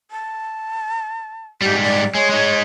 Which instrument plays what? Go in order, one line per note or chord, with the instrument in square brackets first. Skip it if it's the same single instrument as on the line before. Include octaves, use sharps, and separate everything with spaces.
[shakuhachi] A5
[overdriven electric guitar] G#2 G3 [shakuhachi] G4
[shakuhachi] D5
[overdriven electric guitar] G#3 [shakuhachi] C#5
[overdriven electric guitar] G#3 D#4